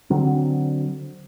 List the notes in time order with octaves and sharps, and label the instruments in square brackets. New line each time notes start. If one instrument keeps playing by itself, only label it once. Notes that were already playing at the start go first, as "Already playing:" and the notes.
[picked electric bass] D3 F#3 C4